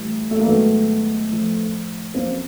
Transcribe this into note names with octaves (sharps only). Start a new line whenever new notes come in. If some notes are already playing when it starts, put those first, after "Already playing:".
Already playing: A2 E3 G3
A3
A#3
G#2 D#3 F#3 A3 B3
A2 F3
F2 C#3 F#3 A#3 C4